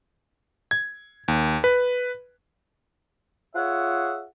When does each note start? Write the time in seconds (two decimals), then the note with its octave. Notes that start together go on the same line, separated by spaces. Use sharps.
0.71 G#6
1.28 D#2
1.64 B4
3.55 F4 G#4 C#5 E5 F#5